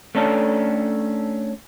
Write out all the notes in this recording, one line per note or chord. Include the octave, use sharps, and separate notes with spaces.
A3 C#4 D4 A4